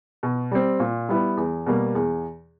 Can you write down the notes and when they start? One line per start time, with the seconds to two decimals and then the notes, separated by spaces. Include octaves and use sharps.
0.23 B2
0.52 G3 C4
0.80 A#2
1.09 G3 B3 E4
1.37 E2
1.66 B2 G3 A#3
1.95 E2